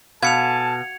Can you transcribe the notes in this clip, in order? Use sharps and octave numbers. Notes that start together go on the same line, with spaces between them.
B2 A4 F5 G#5 A5 G#6 C#7 F7